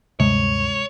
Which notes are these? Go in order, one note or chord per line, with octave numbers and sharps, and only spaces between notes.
D2 G2 C3 G#3 C#5